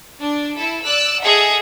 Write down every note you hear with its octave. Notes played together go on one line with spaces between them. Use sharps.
D4
E4 A4
D5 E6 F#6
G#4 A4 D#5 E5 F#5